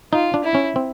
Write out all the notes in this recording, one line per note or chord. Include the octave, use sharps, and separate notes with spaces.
D#4 F4
D4
E4
C#4
C4